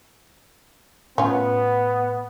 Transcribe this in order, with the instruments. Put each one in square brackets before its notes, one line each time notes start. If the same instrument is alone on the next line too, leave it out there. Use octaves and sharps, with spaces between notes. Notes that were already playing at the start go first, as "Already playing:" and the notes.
[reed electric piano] A2 [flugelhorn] B3 [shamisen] C#4 F4